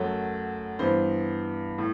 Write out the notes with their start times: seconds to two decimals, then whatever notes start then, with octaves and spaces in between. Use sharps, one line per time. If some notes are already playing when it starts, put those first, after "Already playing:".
Already playing: F#2 F#3 A3
0.79 G2 E3 B3 C5
1.78 A2